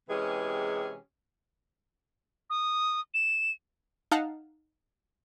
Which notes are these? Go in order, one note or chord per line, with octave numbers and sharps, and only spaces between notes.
C3 E3 G#3 C#4 G4 G#4
D#6
E7
D#4 F5 F#5 A5 A#5